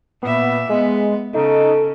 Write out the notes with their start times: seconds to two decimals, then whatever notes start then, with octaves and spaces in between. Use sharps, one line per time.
0.23 A#2 B3 E5
0.69 G#3 B3
1.34 C#3 D#4 A4